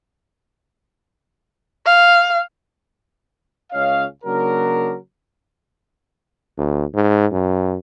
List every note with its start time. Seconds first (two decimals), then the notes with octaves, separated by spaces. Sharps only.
1.86 F5
3.72 C#2 C#4 C#5 D#5 F5
4.24 C#3 F#3 A#3 D4 A#4
6.58 D2
6.95 G#2
7.32 F#2